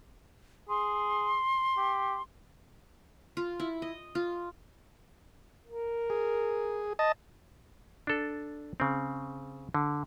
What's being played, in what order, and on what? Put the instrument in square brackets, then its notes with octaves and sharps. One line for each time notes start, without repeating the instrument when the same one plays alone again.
[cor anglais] G#4 [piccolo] C6
[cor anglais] G4
[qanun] F4
E4
D#5
F4
[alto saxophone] A#4
[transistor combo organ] G#4
D#5 A5
[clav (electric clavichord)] D4 A4
C#3 C4
D3